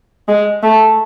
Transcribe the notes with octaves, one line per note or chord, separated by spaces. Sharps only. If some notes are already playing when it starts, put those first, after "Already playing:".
G#3
A3